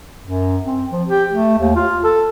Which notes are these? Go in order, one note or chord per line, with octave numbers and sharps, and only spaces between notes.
F#2
C4
F3
G4
A3
D#2
F4
A4